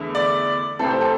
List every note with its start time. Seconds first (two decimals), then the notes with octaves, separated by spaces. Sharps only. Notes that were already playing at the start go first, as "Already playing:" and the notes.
Already playing: E2 D3 A3 E4
0.15 D5
0.79 C2 C3 A3 C4 A4
0.90 C5
1.01 A4